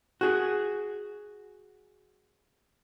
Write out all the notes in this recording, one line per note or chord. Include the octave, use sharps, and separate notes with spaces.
F#4 G#4